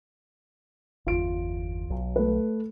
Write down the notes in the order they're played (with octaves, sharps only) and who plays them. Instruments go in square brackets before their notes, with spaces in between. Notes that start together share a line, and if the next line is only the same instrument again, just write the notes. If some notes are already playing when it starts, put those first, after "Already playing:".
[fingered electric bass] G1 E2 [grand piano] F4 D7
[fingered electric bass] B1 F#3
[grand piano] A3 B4